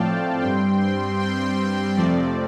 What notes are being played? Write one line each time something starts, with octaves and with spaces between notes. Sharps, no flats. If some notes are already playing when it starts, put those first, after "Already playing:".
Already playing: A2 F3 A3 C4 D5 F5 G5 A5
G2 G3 C4 G5 C6
G5 C6
G5 C6
F2 C3 F3 A3 C4 D5